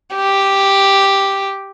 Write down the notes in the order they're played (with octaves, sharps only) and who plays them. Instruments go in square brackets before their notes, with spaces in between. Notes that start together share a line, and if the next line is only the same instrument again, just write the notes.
[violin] G4